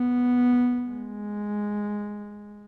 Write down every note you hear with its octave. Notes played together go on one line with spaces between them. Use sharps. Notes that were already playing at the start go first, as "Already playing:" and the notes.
Already playing: B3
G#3